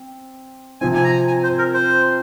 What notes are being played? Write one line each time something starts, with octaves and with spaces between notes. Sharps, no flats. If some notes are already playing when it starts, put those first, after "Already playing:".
Already playing: C4
C3 F3 C4 G#5
G#5
A#5
G#5
C5
A#4
C5